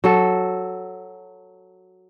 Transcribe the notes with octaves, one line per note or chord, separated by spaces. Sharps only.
F#3 A4